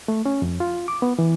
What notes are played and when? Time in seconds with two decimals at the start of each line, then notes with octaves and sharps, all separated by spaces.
0.08 A3
0.26 C#4
0.42 F2
0.60 F4
0.88 D6
1.02 B3
1.19 E3